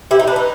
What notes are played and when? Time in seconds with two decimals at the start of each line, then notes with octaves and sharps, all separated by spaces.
0.11 E4 G4
0.19 D#4
0.27 D4 B4
0.36 D#4